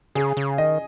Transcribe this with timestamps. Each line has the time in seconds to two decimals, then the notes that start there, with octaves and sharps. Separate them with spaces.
0.15 C#3 G#4
0.37 C#3
0.58 D#3 D#5